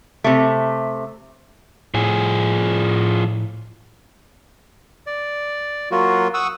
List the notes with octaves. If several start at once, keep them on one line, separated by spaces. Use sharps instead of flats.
C3 A3
A2 F3 G#4
D5
F#3 A#3 F4 F#4
F#5 C#6 D#6 E6